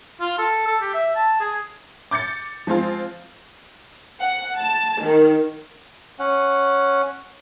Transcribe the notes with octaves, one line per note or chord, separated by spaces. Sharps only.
F4
A4
A4
G4
E5
A5
G#4
D6 G6 A6 C#7
F3 G#3 C4 F4
F#5
A5
D#3
C#4 F#5